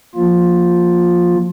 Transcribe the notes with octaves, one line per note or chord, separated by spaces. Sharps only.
F3 A#3 F4